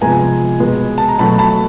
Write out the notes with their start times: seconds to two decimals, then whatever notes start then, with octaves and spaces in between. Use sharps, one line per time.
0.01 C3 F3 G#3 B3 G#5 A#5
0.60 B2 G#3 B3
0.98 A5
1.08 A#5
1.19 B2 F#3 A3 A5 B5
1.38 A5 B5